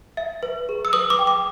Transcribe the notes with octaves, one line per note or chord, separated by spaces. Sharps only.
E5
B4
G#4
E6
B4 D#6
D6
G5
D6